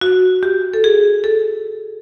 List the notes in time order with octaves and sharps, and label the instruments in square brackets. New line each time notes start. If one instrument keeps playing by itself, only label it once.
[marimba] F#4
G4
A4
G#4
A4